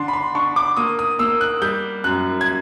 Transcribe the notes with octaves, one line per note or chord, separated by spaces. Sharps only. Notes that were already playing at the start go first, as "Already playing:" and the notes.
Already playing: D3 D4 C6
B5
C6
D4 C#6
D6
A#3 D#6
D#6
A#3 E6
F#6
G3 G6
F#2 F#6
G#6